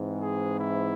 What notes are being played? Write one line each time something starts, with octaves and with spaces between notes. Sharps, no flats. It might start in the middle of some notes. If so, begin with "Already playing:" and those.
Already playing: G#2 E3 G#3 C4
G#4
E4